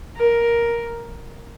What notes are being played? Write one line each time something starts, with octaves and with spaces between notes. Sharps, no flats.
A#4